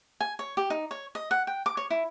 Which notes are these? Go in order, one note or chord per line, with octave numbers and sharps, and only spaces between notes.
G#5
C#5
G4
D#4
C#5
D#5
F#5
G5
D6
C#5
E4